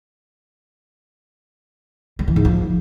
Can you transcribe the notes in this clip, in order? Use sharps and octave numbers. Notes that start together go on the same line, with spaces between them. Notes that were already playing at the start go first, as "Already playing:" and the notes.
G3
E3
G#2
F3